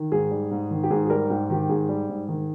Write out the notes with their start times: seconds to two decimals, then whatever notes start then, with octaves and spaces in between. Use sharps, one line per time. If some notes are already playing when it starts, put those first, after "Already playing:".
Already playing: D#3
0.12 G#2 G#4
0.31 G3
0.51 G#2
0.71 D#3
0.84 G4
0.90 G#2 G#4
1.05 G#4
1.10 G3 A#4
1.30 G#2 G4
1.50 D#3 G4
1.69 G#2 G#4
1.89 G3
2.09 G#2
2.29 D#3